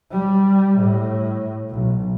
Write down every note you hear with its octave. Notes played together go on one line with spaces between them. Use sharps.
G3
A2
B1